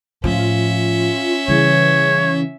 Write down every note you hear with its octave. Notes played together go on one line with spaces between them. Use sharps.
A2 F3 C#4 F4 E5
C#3 E3 G3 C#5